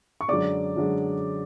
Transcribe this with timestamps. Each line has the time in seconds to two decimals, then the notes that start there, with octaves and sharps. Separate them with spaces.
0.21 C#6
0.29 F#2 D3 G#3 D5 D6
0.77 F#2 D3 G#3